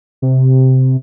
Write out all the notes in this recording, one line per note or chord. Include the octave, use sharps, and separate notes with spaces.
C3